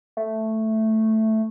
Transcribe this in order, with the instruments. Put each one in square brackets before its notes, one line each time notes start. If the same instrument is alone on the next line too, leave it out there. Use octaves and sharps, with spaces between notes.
[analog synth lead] A3